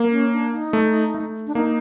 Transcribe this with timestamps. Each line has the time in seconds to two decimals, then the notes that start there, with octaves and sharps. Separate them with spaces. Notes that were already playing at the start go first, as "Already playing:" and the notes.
Already playing: A#3
0.11 C#4
0.33 D4
0.53 D#4
0.73 A3
1.14 A3
1.47 D4
1.55 A#3 D#4